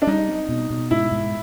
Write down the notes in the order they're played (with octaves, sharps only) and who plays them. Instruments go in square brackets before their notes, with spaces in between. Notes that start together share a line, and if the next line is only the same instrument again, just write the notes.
[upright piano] D4
[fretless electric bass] G3 [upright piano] D#4
[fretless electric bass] C4
B2
B2
[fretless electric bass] G#2 [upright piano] E4
[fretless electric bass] G#2